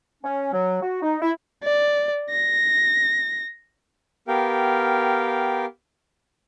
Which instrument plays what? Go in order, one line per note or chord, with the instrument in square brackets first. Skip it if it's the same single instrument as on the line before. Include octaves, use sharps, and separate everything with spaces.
[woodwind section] C#4
F#3
F#4
D#4
E4
[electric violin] D5
A#6
[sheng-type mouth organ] B3 G4 A#4 F5 G5